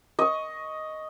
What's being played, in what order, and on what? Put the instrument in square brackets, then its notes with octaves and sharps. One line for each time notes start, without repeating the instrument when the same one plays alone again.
[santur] D#5 C#6